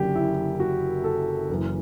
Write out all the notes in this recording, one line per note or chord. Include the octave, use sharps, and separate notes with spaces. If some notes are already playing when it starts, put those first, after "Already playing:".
Already playing: F#1 F#2 D3 G4
E4
F#4
A4
F#1 F#2 E3